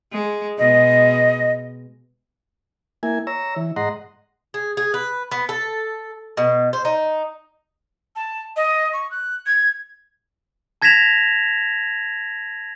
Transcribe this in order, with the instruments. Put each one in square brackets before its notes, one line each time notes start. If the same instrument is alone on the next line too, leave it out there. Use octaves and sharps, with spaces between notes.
[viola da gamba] G#3
[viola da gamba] B2 G#3 [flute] D#5
[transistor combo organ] A#3 E4 G#5
C#5 A#5 E6
E3
G#2 D#5 F#5 A#5 C6
[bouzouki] G#4
G#4
B4
B3
A4
B2
C5
D#4
[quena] A5
D#5
C#6
F#6
G#6
[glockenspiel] A5 G#6 A#6 B6 E7 F7